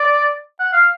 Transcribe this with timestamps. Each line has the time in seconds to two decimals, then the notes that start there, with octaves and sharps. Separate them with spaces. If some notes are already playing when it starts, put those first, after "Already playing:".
Already playing: D5
0.60 F#5
0.73 F5